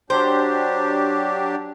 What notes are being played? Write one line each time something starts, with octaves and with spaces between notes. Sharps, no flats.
F#3 D4 G4 C5